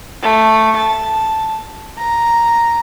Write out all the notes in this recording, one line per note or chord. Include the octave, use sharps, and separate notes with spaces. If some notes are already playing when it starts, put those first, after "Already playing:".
A3
A5
A#5